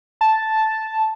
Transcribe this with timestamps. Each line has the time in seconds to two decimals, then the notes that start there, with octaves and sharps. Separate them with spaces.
0.21 A5